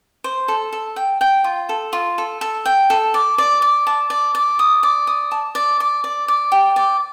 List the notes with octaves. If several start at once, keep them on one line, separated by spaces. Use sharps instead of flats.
C5
A4
A4
G5
G5
F4
A4
F4
A4
A4
G5
A4
D5
D5
D5
A5
D5
D5
D#6
D5
D#6
A5
D5
D5
D5
D5
G5
D5